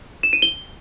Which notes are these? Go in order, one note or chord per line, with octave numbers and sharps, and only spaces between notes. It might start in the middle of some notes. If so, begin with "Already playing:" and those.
E7
D#7
G7